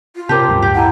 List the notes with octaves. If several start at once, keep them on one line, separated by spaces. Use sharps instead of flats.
F4
C3 C#4 G4 A#4 C5 A5 D6
D1 G2 G3
G4
E4 F#5 A5 A#5